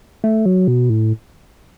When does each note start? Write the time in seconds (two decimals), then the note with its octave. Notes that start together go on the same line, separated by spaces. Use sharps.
0.24 A3
0.46 F#3
0.68 B2
0.90 A2